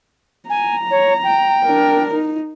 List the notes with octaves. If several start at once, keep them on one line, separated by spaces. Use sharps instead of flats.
G#5 A#5
C#5
G5
D4 A#4
D#4